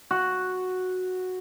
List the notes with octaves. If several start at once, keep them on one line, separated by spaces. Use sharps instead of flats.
F#4